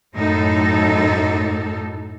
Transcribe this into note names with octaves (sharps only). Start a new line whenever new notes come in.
F#2 A2 D#4 A4